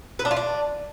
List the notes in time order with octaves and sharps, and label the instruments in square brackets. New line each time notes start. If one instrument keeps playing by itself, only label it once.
[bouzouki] B4
D4
F4
D4